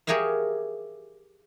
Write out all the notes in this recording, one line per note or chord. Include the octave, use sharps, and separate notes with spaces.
G4 G#4 A#4 C#5 E5 F5